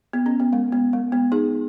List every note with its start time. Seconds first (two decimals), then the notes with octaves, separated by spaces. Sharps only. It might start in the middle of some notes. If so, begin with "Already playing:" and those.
0.13 B3
0.26 C#4
0.40 B3
0.53 G#3
0.72 B3
0.93 G#3
1.12 B3
1.32 D#4 G#4